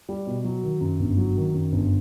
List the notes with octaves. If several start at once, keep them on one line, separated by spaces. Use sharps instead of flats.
G3
B2
F#3
D#3
F#2
G1
F#3
D#3
F#2
G1